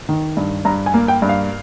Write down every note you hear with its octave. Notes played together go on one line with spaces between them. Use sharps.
D#3
G2
G2 A#5
G#5
A#3
G5
G2
F5